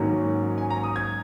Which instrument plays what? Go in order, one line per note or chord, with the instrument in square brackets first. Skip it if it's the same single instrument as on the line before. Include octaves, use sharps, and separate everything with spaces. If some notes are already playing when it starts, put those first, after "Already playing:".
Already playing: [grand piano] G#2 D#3 F#3 A#3 C#4
G#5
A#5
D#6
G#6